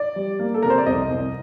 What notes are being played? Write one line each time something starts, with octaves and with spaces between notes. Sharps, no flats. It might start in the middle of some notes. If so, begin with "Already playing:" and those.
Already playing: D5
G3
A#3
A4
C3 A#4
C5
D5
C2 D#5
C2